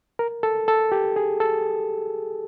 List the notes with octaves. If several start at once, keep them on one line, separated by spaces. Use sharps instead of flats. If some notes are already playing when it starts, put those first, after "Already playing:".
A#4
A4
A4
G4
G#4
A4